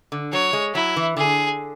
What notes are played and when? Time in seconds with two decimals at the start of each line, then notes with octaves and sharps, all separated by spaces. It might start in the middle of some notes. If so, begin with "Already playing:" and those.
0.12 D3
0.32 F#3 C#5
0.53 G#3
0.74 F#3 E4
0.96 E3
1.17 D3 G#4